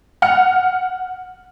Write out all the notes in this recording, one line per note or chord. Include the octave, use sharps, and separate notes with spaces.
F#5 F6 C#7